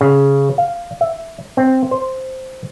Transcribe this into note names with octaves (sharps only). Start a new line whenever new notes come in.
C#3
F5
E5
C4
C5